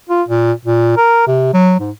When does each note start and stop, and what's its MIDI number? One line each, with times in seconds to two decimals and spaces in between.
0.10 0.22 65
0.29 0.52 46
0.65 0.94 46
0.97 1.25 70
1.27 1.49 48
1.53 1.79 54
1.80 1.91 44